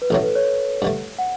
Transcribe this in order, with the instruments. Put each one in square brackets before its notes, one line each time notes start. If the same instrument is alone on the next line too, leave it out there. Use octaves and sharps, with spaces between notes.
[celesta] B4
[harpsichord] A1 A2 F#3 A3 [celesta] A4
[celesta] B4
C#5
[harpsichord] G2 D3 A3
[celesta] F#5